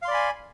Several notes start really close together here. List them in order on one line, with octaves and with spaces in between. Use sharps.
F5 C6 D5 B5 G#5